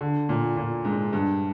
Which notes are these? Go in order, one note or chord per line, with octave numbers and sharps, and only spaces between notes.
D3
A#2
A#2
G#2
G2